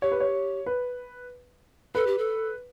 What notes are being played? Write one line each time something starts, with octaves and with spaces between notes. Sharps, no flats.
G4 C#5
B4
C#5
B4
A4 B4
G4
A4